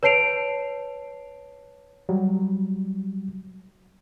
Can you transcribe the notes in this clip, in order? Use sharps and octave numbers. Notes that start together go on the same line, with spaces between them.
B4 C#5 A5 C7 D7 F7
F#3 G3